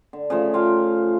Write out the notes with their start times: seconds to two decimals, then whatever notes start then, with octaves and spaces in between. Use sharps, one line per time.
0.13 D3
0.30 C#3 F3 A3
0.54 F4 F5 G5